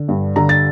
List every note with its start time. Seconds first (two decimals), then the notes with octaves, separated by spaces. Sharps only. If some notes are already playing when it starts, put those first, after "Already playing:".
Already playing: D3
0.09 G2
0.36 D3 A#5
0.49 A6